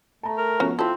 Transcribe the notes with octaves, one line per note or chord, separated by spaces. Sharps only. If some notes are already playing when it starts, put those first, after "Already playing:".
A3 A5 A#5
A#4
F3 B3 C#4 F#4
C4 E4 F4 A4